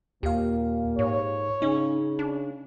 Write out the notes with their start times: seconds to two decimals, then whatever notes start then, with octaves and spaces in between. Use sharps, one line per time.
0.23 D#2 A#2 A#3 G4 F5
0.99 G#2 C#5
1.62 C#3 C#4 D#4
2.19 D4